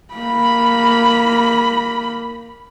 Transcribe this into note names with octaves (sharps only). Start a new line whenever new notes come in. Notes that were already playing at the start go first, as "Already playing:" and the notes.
A#3 B5